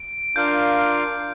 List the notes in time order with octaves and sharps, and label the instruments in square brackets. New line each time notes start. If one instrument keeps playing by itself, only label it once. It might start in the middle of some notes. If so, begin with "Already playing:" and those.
Already playing: [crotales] D7
[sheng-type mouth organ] D4 F4 A#4 F5 [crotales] G6